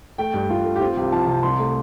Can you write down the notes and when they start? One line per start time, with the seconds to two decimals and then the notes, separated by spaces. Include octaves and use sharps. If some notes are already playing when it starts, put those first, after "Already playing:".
0.18 A3 G5
0.34 G2
0.49 G2 F4
0.65 A3
0.76 G4
0.81 C4 F4
0.97 C2 G4
1.12 F3 A5
1.27 C3
1.43 C2 C6
1.59 A3